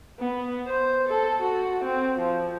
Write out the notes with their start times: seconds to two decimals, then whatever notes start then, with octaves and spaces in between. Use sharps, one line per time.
0.20 B3
0.67 C5
1.09 A4
1.42 F#4
1.84 C4
2.19 F3